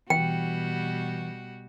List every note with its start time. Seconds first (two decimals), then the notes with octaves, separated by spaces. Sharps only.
0.10 B2 E3 G3 F#4 G5